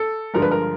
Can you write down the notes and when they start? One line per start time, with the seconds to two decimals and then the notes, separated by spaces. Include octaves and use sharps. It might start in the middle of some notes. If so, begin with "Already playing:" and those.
Already playing: A4
0.34 G2 D3 F3 G#3 A#4
0.42 B4
0.51 A#4